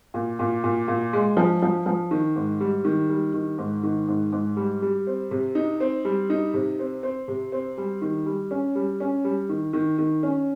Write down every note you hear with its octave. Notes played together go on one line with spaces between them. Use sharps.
A#2
A#2
A#2
A#2
G#3
F3
F3
F3
D#3
G#2
G3
D#3
G3
D#3
G#2
D#3
G#2
G#2
G3
G3
C4
C3
D#4
C4
G3
D#4
C3
C4
C4
C3
C4
G3
D#3
G3
C#4
G3
C#4
G3
D#3
D#3
D#3
C#4